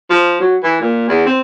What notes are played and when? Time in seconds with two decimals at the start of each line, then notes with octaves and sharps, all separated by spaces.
0.10 F3
0.40 F#3
0.63 E3
0.81 A#2
1.08 E2
1.26 C4